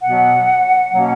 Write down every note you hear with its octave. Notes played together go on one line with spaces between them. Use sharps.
B2 F#3 B3 F#5
B2 F#3 A#3 C#4